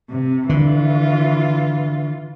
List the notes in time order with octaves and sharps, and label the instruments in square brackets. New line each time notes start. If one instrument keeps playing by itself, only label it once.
[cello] C3
[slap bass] D3 [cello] E3 F4